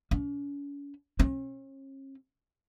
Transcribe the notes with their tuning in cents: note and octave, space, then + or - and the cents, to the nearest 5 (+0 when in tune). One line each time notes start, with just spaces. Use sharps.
C#4 +40
C#4 -40